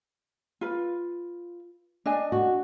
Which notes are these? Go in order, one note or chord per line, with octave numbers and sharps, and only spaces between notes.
F4 B4
D4 D#5 G#5
F#4